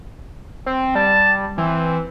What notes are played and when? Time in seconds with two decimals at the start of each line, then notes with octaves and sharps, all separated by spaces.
0.66 C4
0.95 G3 A5
1.58 E3 C4